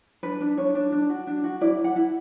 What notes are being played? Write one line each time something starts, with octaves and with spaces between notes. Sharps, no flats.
D4 B4
D4
D4 C#5
D4
D4
F#4
D4
F#4
E4 D5
E4
F#5
E4